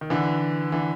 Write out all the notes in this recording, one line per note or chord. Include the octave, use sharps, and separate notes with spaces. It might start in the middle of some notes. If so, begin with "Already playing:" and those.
D#3
D3 E3
D3 E3